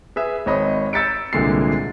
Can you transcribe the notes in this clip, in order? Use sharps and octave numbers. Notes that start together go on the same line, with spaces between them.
G#4 B4 E5
G#1 C#5 D#5 B5 D#6
E6 G6 A6 B6 C#7 D7
C2 A#2 D3 G#3 C7